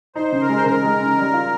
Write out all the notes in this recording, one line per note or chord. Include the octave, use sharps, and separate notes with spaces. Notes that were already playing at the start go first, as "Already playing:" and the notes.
D#4 C5
C#3
A#4
G#3
C5
C#3 A#4
G#3
C#3
G3
F4